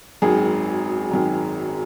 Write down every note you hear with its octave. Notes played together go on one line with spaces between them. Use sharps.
G#1 F#2 D#3 G#4
G#1 F#2 D#3